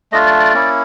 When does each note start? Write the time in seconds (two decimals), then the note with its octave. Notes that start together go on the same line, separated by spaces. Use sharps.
0.12 A3 D4 F4 D#5
0.26 D5
0.40 D5
0.54 A#3 C#4 E4